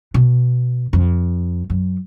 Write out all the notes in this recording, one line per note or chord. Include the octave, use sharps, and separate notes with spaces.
B2
F2
F#2